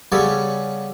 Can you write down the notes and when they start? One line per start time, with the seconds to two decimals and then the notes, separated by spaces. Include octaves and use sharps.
0.12 C#3 G3 B3 C#4 A4